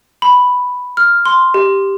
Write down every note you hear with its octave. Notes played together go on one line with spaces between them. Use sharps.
B5
F6
C6
G4